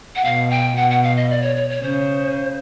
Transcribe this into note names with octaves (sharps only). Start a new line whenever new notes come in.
F#5
B2 F5
G5
B2 F#5
F#5
F5
D#5
D5
C#5
C#5
C#5
C#3 C5